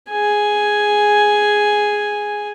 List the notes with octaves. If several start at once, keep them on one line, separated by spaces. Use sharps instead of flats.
G#4 G#5